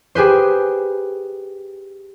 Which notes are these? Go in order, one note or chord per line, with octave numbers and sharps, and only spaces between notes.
G4 G#4 B4 C5